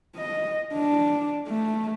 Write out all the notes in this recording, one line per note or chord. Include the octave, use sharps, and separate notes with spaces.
D#5
D4
A3